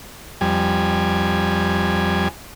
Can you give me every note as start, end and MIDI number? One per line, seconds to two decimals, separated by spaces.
0.41 2.28 41
0.41 2.28 55
0.41 2.28 80